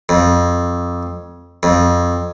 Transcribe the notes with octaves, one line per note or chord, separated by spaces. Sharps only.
F2
F2